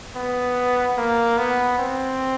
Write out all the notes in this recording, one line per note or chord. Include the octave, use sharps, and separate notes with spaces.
B3
A#3
B3
C4